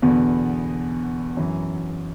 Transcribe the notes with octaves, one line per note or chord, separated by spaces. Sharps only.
E2 B2 D3 B3
F#2 E3